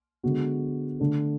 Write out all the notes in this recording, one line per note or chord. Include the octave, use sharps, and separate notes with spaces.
D3 G#3 B3 F#4
D3 A3 D4